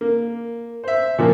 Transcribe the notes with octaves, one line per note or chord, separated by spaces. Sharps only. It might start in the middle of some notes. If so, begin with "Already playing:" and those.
A#3
C5 E5
A#2 F3 A#3